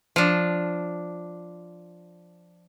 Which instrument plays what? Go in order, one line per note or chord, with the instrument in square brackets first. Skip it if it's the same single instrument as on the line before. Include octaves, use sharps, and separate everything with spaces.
[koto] F3 D4